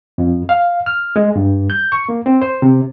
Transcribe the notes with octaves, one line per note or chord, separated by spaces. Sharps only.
F2
F5
F6
G#3
G2
G6
C#6
A#3
C4
C5
C3